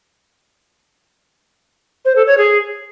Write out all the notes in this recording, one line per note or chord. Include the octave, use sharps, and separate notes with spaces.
C5
A4
C#5
G#4